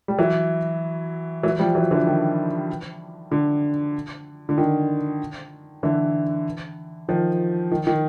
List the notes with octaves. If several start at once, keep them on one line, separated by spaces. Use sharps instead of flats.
G3
E3 F#3
E3 F#3
F3 G3
E3 F#3
D3 E3
D#3
D3
D3
D#3
D3 E3
D#3 F3
D#3
D#3